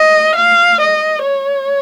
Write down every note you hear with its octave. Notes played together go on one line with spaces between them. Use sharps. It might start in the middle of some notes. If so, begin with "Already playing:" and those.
Already playing: D#5
F5
D#5
C#5